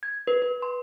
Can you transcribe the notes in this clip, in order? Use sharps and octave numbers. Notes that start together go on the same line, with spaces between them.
G#6
B4
B4
C6